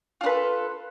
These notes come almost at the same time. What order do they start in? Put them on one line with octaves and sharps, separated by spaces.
F4 D4 B4 A4